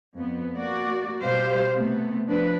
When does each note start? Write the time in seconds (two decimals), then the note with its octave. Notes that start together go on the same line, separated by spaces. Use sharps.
0.14 F2 B3
0.56 A#3 F#4 D5
1.20 B2 G3 G4 C5 F5
1.72 C3 A3 B3
2.28 F3 D4 B4